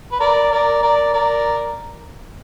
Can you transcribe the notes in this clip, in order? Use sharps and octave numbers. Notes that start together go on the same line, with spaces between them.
B4
A#4 D5
A#4 D5
A#4 D5
A#4 D5